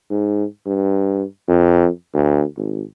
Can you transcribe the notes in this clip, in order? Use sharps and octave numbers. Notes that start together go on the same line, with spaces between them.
G#2
G2
F2
D2
G#1